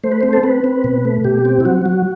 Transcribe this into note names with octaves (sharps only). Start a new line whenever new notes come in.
A3 C5
B4
C4 C5
A4
C4 B4
C4
B2
A3
B2 G4
C4
E4
F#3 F#4
F#3